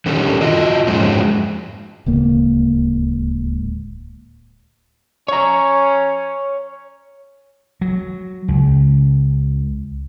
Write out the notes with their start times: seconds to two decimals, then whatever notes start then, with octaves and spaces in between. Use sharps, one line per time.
0.06 D3 D#3 G3 C#4 G4 A4
0.41 F4 F#4 D#5
0.87 F2 G#2 F#3 G#3 C#4
2.06 D1 C#2 A#3
5.28 C#4 C#5 A#5
7.81 F#3
8.48 C#2